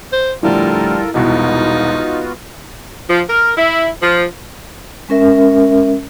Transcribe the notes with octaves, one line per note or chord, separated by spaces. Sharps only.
C5
A2 D3 F3 G3 E4 F4 A4 A#4
E1 C2 B2 B3 D#4 F4 F#4
F3
A#4
E4
F3
G#3 C#4 A#4 E5